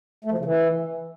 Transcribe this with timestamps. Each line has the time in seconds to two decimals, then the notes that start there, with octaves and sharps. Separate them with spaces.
0.25 A3
0.31 F3
0.38 C#3
0.45 E3